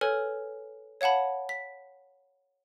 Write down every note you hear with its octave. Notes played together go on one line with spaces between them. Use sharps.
A4 B4 C#5 G#5 F6
C#5 F5 F#5 A5 B5
B6